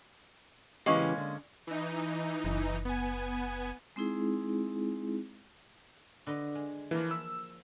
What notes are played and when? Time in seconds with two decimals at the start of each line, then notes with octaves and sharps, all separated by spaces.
0.86 C#3 E3 G#3 A#3 C#4 G4
1.17 D3
1.67 E3 D#4
2.44 F#1
2.85 B3 G#5
3.96 G#3 C4 D#4 E4 G#4
6.27 D3 B4 D#5
6.55 G#3
6.91 E3 F3 A#3
7.11 B5 E6